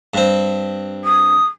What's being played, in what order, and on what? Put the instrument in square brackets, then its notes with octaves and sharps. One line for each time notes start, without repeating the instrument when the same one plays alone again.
[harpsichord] G2 C4
[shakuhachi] D#6